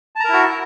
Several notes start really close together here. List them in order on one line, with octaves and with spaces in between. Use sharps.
A5 A#5 A#4 E4 F#4